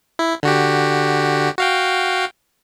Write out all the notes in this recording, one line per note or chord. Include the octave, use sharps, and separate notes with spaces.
E4
D3 F#4 G4
F#4 F5 G5